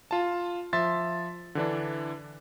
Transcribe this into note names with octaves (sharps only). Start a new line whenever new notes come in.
F4 A5
F3 E5 C6 A6
D3 E3 D4